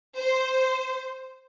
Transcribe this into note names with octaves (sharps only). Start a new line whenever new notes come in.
C5